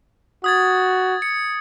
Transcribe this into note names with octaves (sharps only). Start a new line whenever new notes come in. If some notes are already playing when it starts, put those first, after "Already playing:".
F#4 D#6 G#6 A6
C#7